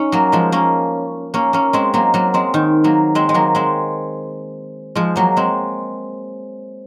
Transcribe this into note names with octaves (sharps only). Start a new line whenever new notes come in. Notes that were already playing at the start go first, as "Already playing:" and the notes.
Already playing: C#4 D#4
F#3 A#3
F3 G#3
A#3 C#4
A#3 C#4
A#3 C#4
G#3 C4
F#3 A#3
F#3 A#3
G#3 C4
D#3
F#3 A#3
G#3 C4
G#3
F#3 A#3
G#3 C4
F3 G#3
F#3 A#3
G#3 C4